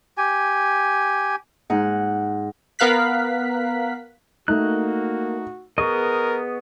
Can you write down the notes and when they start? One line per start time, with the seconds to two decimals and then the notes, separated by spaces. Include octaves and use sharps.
0.18 G4 G#5
1.70 G#2 D#4 F#5
2.79 B3 A#4 F5 F#6 B6
4.48 A3 A#3 D#4 F#4 F#6
5.78 B3 G#4 A#4 D#5 C#6